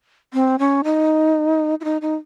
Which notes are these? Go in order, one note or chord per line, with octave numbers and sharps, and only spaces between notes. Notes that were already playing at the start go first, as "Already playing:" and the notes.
C4
C#4
D#4
E4
D#4
D#4